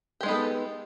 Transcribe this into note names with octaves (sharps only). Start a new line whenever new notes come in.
G#3 B3 D#4 G4 A4